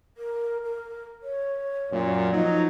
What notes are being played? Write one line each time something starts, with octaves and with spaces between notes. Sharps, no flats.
A#4
A#4
C#5
F#2 A#2
F3 F#3 D#4